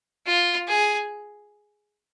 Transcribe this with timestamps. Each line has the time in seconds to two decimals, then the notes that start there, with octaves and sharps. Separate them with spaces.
0.27 F4
0.67 G#4